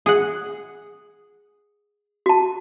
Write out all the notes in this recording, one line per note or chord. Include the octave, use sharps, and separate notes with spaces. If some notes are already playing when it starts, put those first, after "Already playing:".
G#4 F#5
F#4 A5